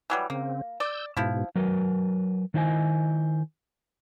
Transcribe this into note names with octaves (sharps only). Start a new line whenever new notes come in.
E3 F#3 G3
C#3 A#3 C4
D5 E6 G6
G#2 B2 F3 E4
F#3 A#4 B4
D#3 D4 E4 C5 D#5 G#5